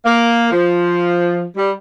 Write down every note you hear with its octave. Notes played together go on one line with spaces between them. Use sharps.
A#3
F3
G3